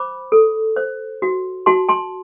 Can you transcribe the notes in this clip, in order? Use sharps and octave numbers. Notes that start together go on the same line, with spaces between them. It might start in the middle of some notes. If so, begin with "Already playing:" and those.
Already playing: C5 B5 D6
A4
C5
F#4
F#4 A5 C6
A5 C6